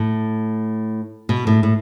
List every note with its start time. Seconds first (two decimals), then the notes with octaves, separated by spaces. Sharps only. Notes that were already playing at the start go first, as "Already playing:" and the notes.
Already playing: A2
1.29 B2
1.47 A2
1.63 A2